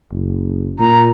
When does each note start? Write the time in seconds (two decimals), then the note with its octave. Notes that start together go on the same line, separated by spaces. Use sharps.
0.11 F#1
0.79 A#2 A#5